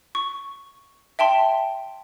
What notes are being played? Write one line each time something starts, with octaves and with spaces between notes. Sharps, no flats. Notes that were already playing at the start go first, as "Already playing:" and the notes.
C#6
E5 G5 A5 C6